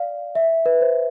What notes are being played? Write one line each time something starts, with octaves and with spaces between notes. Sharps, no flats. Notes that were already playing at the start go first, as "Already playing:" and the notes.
Already playing: D5 F5
E5
B4
C5